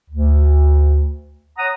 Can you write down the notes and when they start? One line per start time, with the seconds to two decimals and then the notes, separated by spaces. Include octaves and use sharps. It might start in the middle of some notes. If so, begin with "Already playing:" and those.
0.10 D2
1.59 C#5 F#5 A#5 D#6